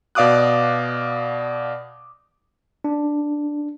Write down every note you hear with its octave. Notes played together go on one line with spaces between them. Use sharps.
B2 D5 F5 D6 D#6 F#6
D4